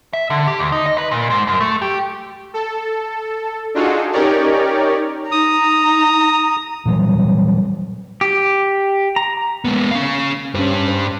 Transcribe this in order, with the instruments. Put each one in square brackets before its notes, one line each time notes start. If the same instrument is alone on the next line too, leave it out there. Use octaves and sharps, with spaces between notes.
[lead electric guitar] E5
D3
G4
D2
D#4
D#5
B4
A#2
G#2
F#2
A3
G4
[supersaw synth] A4
D4 D#4 F4 F#4 G#4 A4
C#4 D#4 G4 A#4 C#5 D5
[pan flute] D#4 [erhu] A#5 [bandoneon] D#6
[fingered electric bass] A#2 E3 F#3 G3
[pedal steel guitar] G4
A#5
[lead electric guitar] G#3 B3 [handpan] A#3
[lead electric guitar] C#4 F5
[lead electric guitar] G2 G3 [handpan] C#4 C5
[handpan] C5